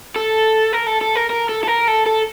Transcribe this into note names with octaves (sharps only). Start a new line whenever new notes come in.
A4
A#4
A4
A4
A#4
A#4
A4
A4
A#4
A4
A4